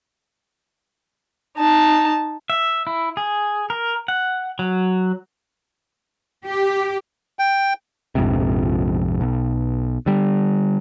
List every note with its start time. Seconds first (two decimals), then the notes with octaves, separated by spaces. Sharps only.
1.57 D#4 A5
2.50 E5
2.87 E4
3.17 G#4
3.70 A#4
4.08 F#5
4.59 F#3
6.45 G4
7.39 G5
8.15 A#1 F2 G#2 C3
9.21 B1
10.06 D3 G3